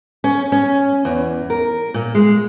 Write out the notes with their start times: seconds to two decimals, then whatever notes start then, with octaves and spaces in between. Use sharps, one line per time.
0.24 C#4
0.52 C#4
1.05 E2
1.50 A#4
1.94 A#2
2.15 G#3